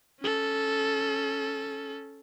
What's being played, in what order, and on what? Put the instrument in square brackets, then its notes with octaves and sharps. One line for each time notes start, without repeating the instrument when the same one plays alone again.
[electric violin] C#4 A4